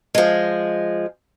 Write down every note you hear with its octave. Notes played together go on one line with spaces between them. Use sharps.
F3 G#3